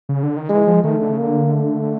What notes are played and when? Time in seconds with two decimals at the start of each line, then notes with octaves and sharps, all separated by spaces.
0.09 C#3
0.23 D3
0.37 D#3
0.49 E3 G#3
0.67 F3
0.84 D#3 A3
1.01 D3
1.12 C#3
1.18 D3 A#3
1.52 A3